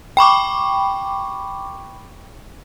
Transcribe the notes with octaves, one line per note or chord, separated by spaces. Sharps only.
G5 B5 C#6 D6